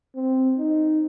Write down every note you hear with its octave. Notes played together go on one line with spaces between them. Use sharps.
C4
D#4